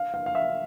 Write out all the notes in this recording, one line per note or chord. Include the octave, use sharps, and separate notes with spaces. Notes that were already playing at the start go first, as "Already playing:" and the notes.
Already playing: F5
F5
F5
E5